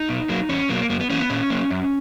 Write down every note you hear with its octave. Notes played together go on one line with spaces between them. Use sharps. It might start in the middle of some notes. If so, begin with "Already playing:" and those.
Already playing: D#4
B2
F#3 A#3
E2 C#4
B2 F#3 A#3
F#2 A#3
B3
E3 A#3 C#4
B3
A#2 C#4
F#3 A#3
F#2